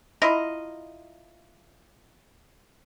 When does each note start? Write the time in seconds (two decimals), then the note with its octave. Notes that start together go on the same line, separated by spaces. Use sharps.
0.22 E4 F4 D#5 A#5